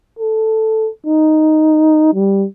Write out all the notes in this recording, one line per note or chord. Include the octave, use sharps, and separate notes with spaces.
A4
D#4
G3